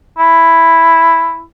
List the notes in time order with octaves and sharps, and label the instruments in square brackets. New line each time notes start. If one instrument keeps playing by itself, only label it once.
[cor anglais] E4